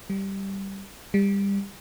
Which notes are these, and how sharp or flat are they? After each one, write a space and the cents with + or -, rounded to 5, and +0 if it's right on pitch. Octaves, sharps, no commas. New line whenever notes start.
G3 -5
G3 +25